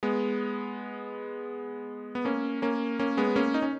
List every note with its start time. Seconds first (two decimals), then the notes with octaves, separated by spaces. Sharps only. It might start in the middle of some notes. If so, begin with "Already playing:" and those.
0.03 G#3 B3
2.15 B3
2.25 A#3 C#4
2.62 A#3 C#4
2.99 A#3 C#4
3.17 G#3 B3
3.36 A#3 C#4
3.54 D#4
3.62 C#4